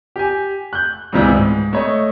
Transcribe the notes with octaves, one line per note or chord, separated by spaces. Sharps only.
G4 G#5
F#6 G6
C#2 G2 C3 E3 G3 G#3
G#2
A3 C#5 D#5